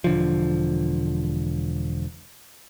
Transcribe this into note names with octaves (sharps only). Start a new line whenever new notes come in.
E1 D3 F3